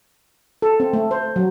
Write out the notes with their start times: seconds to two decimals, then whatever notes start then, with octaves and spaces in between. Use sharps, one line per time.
0.62 A4
0.80 C4
0.93 A3
1.11 C5
1.36 F#3